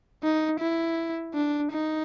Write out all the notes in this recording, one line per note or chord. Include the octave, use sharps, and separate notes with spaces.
D#4
E4
D4
D#4